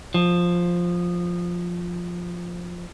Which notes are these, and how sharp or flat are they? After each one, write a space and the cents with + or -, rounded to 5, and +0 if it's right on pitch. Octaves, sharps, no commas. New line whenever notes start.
F3 +5